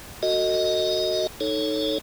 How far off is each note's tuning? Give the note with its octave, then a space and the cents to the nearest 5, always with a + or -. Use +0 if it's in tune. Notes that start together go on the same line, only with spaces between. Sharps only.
F#4 +0 A4 +40 D#5 +5
D#4 +0 A4 +0 C#5 +0